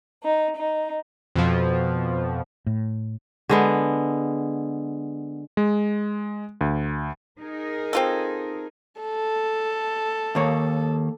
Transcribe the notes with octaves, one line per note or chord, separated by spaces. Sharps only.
D#4
D#4
F2 B2 F3
A2
D3 G#3 B3
G#3
D2
D#4 G#4 A#4
C4 F4 A4
A4
D#2 A#3 C#5